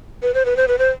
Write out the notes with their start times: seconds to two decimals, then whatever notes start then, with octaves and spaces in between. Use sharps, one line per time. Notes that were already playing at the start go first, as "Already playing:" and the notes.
0.23 B4
0.34 C5
0.45 B4
0.57 C5
0.68 B4
0.79 C5